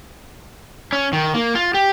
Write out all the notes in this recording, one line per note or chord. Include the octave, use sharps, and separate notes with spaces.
C#4
D#3
A#3
F4
G4